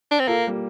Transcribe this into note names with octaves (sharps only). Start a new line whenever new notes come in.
D4
C4
A#3 F4 A4
G3 A#3